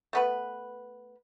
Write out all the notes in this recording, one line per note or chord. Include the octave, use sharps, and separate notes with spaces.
A3 B3 B4